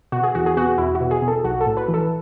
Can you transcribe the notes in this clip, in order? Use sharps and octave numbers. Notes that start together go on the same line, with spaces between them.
B2 F#4
G#4
E2 F#4
G#4
B2 F#4
E2 E4
F#4
B2
G#4
B2
A4
B1 F#4
A4
A2
B4
E3
A4